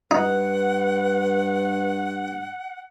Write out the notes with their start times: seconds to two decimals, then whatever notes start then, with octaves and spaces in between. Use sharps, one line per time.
0.11 G2 D#4 B4 F#5